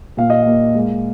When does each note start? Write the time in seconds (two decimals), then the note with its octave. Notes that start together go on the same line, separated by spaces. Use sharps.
0.17 A#2 F5
0.30 D#5
0.42 A#3 F5
0.74 G#3